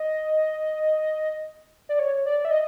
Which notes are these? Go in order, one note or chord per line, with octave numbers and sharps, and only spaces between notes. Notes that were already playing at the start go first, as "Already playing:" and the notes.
Already playing: D#5
D5
C#5
D5
E5
D#5